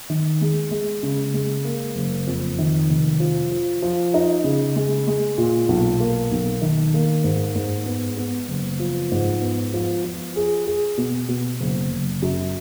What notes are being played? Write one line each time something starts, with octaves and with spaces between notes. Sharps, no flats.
D#3
G#3
G#3
C#3
G#3
A#3
F#1
F2
D#3
F1
F3
F3
F3
D#4
C#3
G#3
G#3
A#2
B1
A#3
B1
D#3
A#3
G#2
G#2
B3
B3
F#1
F3
G#2
B3
F3
F3
G#4
G#4
B2
B2
F#1
F#1
F#2